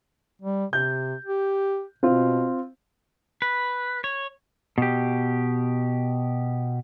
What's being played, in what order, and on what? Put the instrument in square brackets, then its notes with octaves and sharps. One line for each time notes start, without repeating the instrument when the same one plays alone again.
[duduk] G3
[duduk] C3 [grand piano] G6
[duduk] G4
[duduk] B2 [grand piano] C4 F4
[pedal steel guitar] B4
C#5
[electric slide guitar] B2 G4